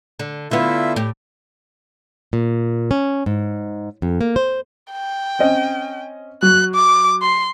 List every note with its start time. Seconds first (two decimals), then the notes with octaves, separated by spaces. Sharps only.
0.19 D3
0.51 D3 B3 E4 F4 E5
0.96 A2 G4
2.33 A#2
2.91 C#4
3.26 G#2
4.02 F2
4.21 A#3
4.36 C5
4.92 G5
5.39 C4 C#4 D#5
6.42 F#3 F#6
6.75 D6
7.22 C6